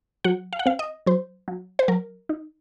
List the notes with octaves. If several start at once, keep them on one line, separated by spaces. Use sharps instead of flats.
F#3 F#5
F5
F#5
C4 F5
D#5
F#3 C5
F#3
C5
F#3 A#4
D#4